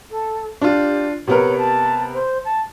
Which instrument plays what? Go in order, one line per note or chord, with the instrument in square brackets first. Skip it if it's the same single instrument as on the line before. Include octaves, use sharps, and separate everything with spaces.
[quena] A4
[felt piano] D4 F4 [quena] G4
[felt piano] C3 B3 A#4 [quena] C#5
[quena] A5
C5
A5